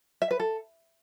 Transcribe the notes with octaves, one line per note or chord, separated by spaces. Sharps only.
E5
B4
A4